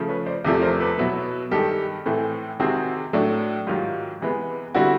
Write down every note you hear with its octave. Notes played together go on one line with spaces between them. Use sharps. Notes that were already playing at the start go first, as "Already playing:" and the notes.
Already playing: C#3 F3 A3
B4 C#5
C5 D5
E2 C3 F3 A3
A#4 C5
A4 B4
B2 F#3 B3 E4
G2 D#3 G#3 G4 A4
A2 E3 A3 C4
C3 D#3 G#3 C4 F#4 G#4
A2 F#3 A3 D4
G#2 D#3 F#3 F4 G4
C3 E3 G#3 B3
D3 G3 C4 E4 F#4